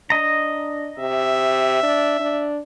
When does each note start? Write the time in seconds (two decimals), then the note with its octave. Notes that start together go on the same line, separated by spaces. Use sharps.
0.10 D4 D#5 A#5
0.98 C3 E5
1.83 D4
2.19 D4